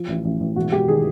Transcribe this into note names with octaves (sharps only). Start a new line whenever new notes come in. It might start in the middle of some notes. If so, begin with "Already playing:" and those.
Already playing: F3
A1
A1
A1
E1 F#4
E1 G4
D#3 G#4